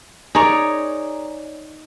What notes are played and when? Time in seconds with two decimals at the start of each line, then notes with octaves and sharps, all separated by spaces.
0.35 D#4 G#4 A#4 C#5 D5 A#5